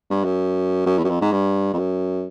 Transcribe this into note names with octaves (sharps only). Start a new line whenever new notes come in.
G2
F#2
F#2
E2
F#2
F2
G#2
G2
F2
F#2